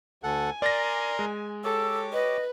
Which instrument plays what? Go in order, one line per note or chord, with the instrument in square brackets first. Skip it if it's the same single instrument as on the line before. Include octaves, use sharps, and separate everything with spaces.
[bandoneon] D2 A4 F#5 [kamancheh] G#5
[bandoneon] A#4 A#5 C6 [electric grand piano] D5 A6 A#6
[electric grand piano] G#3
[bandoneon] G4 C#5 D6 [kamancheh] A4 [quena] E6
[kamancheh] B4 [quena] D#5